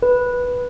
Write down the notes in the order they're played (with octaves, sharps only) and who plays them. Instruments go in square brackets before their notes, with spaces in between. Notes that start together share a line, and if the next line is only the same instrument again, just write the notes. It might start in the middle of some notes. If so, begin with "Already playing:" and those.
[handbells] B4